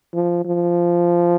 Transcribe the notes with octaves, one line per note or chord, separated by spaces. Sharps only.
F3
F3